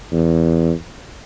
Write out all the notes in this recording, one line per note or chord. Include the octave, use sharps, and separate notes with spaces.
E2